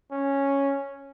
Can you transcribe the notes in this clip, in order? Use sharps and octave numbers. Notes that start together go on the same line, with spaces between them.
C#4